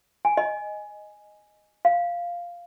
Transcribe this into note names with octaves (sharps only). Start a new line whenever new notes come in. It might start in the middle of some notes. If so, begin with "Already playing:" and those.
G#5
D#5
F5